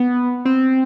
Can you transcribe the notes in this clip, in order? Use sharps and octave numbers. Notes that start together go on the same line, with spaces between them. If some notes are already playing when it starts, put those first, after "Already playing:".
Already playing: B3
C4